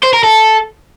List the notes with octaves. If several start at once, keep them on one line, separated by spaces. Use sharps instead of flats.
C5
A#4
A4